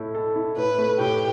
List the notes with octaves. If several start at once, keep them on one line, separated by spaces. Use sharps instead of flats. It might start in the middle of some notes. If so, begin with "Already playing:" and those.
Already playing: A2 E4 A4
A4
E4
A2 B4
A3
A2 G4